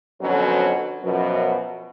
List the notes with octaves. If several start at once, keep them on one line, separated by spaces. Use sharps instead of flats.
F2 B2 D3 F3 F#3 C#4
F#2 B2 F3